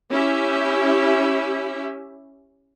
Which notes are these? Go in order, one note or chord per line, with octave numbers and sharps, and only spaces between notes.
C#4 E4 G4 E5